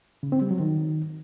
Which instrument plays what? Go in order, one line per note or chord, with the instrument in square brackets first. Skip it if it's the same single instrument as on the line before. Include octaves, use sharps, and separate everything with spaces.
[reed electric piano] C#3
C4
G3
F#3
D#3